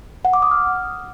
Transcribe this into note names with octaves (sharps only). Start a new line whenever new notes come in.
F#5
D6
D#6
F6